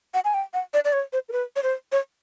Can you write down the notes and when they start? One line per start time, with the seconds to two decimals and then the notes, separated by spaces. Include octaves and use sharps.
0.14 F#5
0.25 G#5
0.34 G5
0.54 F#5
0.74 D5
0.85 D5
0.93 C#5
1.13 C5
1.29 A#4
1.32 B4
1.56 C#5
1.63 C5
1.92 C#5